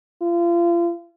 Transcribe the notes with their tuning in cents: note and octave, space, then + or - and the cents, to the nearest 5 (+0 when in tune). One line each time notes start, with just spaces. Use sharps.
F4 -35